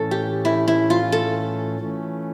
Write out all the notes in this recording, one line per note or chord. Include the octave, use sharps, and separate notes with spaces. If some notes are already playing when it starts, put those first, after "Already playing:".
Already playing: A2 E3 A3 C#4 A4
G4
E4
E4
F4
A4
E3 A3 C#4